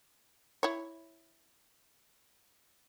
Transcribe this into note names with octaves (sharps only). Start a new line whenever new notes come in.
E4 C#5